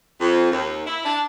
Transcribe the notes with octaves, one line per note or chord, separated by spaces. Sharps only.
F2
D#2
E4
D4